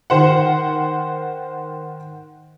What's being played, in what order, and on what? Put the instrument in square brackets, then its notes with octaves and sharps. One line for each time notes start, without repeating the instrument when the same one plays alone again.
[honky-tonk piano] D#3 C5 F#5